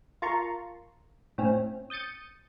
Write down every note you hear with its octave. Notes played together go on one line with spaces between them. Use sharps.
F4 A#4 A5 A#5 C6 C#6
A2 C4 C#4
D#6 G6 A6 C#7 D#7